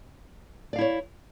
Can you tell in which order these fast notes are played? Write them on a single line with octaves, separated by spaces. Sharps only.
D5 F5 E4 C#5